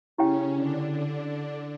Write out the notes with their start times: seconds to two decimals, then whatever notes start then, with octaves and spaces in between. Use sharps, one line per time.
0.17 C#3 C#4 E4 G4 C#5 G5
0.54 D3 D4
0.90 D3 D4